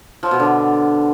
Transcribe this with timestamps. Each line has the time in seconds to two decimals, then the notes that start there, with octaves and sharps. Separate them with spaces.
0.23 F3
0.31 B2
0.40 D3